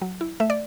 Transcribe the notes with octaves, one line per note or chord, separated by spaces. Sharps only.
F#3
E4
A3 E5
D5